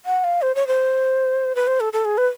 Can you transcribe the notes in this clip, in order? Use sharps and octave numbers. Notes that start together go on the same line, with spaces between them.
F#5
F5
C5
C#5
C5
B4
C5
A4
A4
G#4
B4